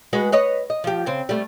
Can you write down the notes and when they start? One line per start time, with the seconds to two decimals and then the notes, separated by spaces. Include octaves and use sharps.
0.13 G#3 F#4 B4
0.32 B4 C#5 D#5
0.70 D#5
0.84 F3 G4
1.06 C#3 C4
1.29 G3 A3